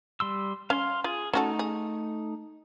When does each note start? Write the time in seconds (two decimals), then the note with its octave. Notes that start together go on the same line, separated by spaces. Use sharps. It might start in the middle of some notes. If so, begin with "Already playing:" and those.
0.20 G3 C6 E6
0.70 C#4 F5 C6
1.04 F4 G#4
1.33 A3 C#4 D#4 F#4 A4
1.59 G#4